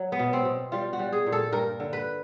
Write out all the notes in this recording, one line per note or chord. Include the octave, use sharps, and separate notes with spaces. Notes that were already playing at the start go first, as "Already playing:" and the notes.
Already playing: F#3
B3
B2
C4
B2
G3 F4
F#4
G3
G#4
A#2
A4
G2 A#4
D3
B4